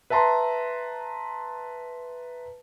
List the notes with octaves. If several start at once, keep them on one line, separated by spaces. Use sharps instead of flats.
B4 E5 A5 A#5 C6